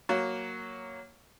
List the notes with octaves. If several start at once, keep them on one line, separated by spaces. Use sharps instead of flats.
F#3 A#3